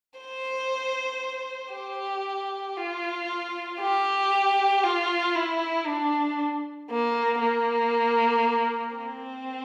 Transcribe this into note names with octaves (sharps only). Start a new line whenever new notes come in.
C5
G4
F4
G4
F4
E4
D4
A#3
A#3
C4